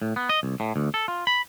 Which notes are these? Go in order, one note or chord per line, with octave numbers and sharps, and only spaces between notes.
A2
B3
D#5
C2
A2
D2
A4
F4
B5